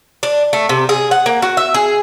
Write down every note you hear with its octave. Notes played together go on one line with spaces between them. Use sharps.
D4
A3
C3
G#4
F#5
A#3
F#4
E5
G#4